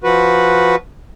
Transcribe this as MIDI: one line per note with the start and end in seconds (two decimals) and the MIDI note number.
0.04 0.76 53
0.04 0.76 66
0.04 0.76 71